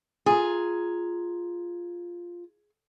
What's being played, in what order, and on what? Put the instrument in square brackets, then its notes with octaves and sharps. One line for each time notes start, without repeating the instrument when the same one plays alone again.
[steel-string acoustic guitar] F4 A#5 [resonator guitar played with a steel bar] G#4